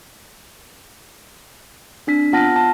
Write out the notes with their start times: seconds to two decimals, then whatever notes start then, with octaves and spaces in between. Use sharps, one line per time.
2.07 C4 D4 B6
2.33 B3 F4 F#5 A5 F6 A#6
2.56 A5